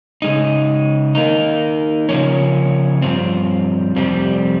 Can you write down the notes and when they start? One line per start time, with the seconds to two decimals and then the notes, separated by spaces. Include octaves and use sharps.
0.22 C#3 G#3 D#4
1.15 D#3 A#3 D#4
2.09 C#3 F3 A#3 C#4
3.02 G2 F3 C4
3.96 F2 C3 G3 C4